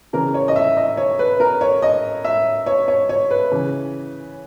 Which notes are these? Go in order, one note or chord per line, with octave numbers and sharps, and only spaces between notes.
C#3 E3 A#4
C#5
D#5
E5
D#5
C#5
B4
A#4
C#5
D#5
E5
C#5
C#5
C#5
B4
C#3 E3